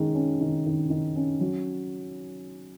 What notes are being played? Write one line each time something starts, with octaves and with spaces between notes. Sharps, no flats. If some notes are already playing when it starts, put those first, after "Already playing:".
Already playing: D#3 G#3 C#4
C#4
D#3
D#3
D#3
C#4
F#3